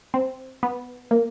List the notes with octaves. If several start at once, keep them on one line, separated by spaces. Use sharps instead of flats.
C4
B3
A#3